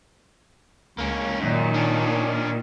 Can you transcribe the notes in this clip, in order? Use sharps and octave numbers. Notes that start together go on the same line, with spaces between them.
C#2 A#3 C#4
F#2 A#2 D#3
C#4 D4